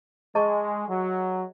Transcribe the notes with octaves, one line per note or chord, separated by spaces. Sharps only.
G#3 G#4 D#5 A5 C#6
F#3